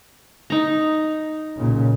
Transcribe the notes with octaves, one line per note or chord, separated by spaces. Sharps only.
D#4 A#5
B1 A#2 C#3